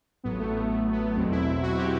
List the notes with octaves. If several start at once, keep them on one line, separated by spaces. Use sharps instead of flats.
A1 A2 F#3 B3
A3
B3
A3
B3
E2 B2 F#3 C4
E4
F#4
G4